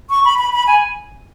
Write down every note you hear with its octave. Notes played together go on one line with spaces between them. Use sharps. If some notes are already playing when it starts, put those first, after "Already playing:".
C#6
B5
B5
B5
G#5